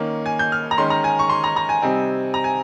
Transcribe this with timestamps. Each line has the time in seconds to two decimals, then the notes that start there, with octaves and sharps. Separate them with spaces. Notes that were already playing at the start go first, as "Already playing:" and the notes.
Already playing: D#3 A#3 C#4
0.26 G#5
0.39 G6
0.52 F6
0.71 A#5
0.78 D#3 G#3 C#4 C6
0.90 A#5
1.04 G#5
1.19 C#6
1.29 C6
1.44 A#5
1.56 A#5
1.69 G#5
1.82 C3 G3 C4 D#4
2.34 A#5
2.44 G#5